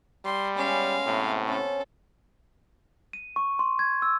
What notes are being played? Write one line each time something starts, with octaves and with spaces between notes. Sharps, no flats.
G3 C6
G#3 B3 C#4 F5
A2 C3 B3
C#4 A4 C5
D#7
C#6
C6
G#6
E6